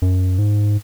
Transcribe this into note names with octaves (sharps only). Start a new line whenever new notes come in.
F#2
G#2